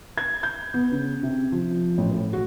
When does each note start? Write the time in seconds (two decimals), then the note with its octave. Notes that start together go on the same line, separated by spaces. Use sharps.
0.18 G#6
0.43 G6
0.74 B3
0.92 C#3
1.23 C3
1.52 F3
1.98 A1
2.12 A2
2.33 F#4